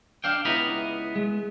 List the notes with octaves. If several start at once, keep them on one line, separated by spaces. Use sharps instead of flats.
D4 F5 G5
C#2 B3 E4 D#5 A#5 B5
G#3